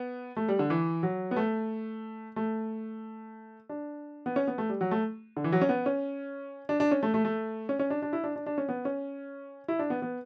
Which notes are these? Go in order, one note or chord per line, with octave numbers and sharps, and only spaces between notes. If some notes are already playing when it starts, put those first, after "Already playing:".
Already playing: B3
A3
G3
D3
E3
F#3
B3
A3
A3
D4
B3
C#4
B3
A3
G3
F#3
A3
D3
E3
F#3
C#4
B3
C#4
D4
D4
C#4
A3
A3
A3
C#4
C#4
D4
D4
E4
D4
D4
D4
C#4
B3
C#4
E4
D4
B3
B3